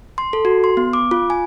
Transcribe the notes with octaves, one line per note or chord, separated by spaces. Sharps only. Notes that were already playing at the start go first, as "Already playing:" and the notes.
C6
A4
F#4
C6
B3
D6
F4
G#5